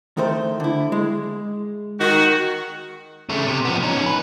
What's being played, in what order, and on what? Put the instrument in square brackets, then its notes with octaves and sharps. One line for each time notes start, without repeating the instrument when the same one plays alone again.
[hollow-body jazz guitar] D#3 A3 C5
D3 E4
G#3
[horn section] D#3 F#4
[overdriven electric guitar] C#3 A3
C3
F3 B3
C#4 D#4
B4